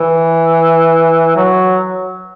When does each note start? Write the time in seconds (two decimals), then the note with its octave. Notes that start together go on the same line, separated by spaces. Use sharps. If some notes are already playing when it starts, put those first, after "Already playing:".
Already playing: E3
1.36 F#3